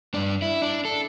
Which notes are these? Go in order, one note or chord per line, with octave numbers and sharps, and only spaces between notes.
G2 D4
E4
D4
A4